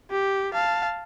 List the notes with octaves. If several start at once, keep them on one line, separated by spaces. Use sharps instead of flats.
G4
F5 A5